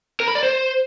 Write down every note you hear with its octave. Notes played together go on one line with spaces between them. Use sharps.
A#4
B5
D5
C5